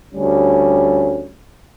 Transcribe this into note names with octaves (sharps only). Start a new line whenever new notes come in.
D2 G3 C#4